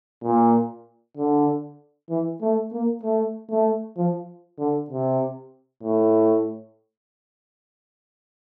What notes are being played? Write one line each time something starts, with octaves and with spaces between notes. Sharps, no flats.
A#2
D3
E3
A3
A#3
A3
A3
F3
D3
C3
A2